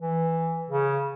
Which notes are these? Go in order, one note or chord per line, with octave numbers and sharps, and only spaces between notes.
E3
C#3